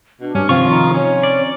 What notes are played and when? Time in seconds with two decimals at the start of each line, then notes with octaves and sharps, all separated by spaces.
0.21 B2 D4
0.35 G2 C#4
0.49 C3 D#3 F3 C4 F4 F5 C#6
0.70 D#4
0.94 C#4 C#5
1.23 D5